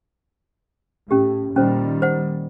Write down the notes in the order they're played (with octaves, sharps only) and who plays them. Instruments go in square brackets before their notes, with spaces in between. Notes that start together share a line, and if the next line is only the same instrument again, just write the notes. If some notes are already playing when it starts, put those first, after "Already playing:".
[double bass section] A2 [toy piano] C#4 G4
[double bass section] A#2 D#3 G3 [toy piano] C#4 C5
[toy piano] C5 F#5